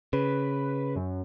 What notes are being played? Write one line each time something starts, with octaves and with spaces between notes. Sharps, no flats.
C#3 B4
F#2